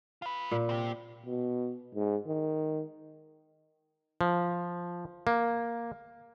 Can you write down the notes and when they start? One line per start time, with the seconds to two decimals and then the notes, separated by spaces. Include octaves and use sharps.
0.22 F4 B4
0.51 A#2
0.69 C4 G4
1.26 B2
1.95 G#2
2.26 D#3
4.21 F3
5.27 A#3